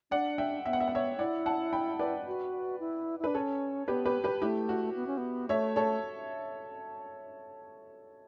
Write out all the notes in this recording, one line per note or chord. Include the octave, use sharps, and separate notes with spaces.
D4 D5 F#5
E5 G5
B3 E5
F#5
E5
F#5
C#5 E5
E4 D5 F#5
F#5 A5
G5 B5
B4 D5
F#4
E4
E4
D4 B4
C#4 A4 C#5
B3 G4 B4
G4 B4
G4 B4
A3 E4 G4
F#4
B3
C#4
B3
A3 C#5 E5
A4 C#5